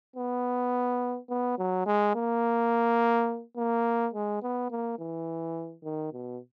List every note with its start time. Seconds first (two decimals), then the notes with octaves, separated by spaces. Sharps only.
0.16 B3
1.30 B3
1.58 F#3
1.86 G#3
2.15 A#3
3.57 A#3
4.13 G#3
4.43 B3
4.70 A#3
4.99 E3
5.84 D#3
6.13 B2